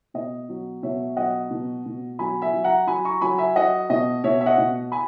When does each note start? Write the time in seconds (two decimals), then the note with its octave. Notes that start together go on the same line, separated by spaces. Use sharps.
0.14 B2 D#5
0.49 F#3
0.83 B2 C#5 E5
1.16 F#3 D#5 F#5
1.51 B2
1.86 B2
2.19 F#3 G#5 B5
2.41 E5 G#5
2.54 F#3
2.64 F#5 A#5
2.87 F#3 G#5 B5
3.05 A#5 C#6
3.21 F#3 G#5 B5
3.38 E5 G#5
3.56 F#3 D#5 F#5
3.90 B2 D#5
4.24 B2 C#5 E5
4.41 E5
4.46 D#5 F#5
4.58 B2
4.92 G#5 B5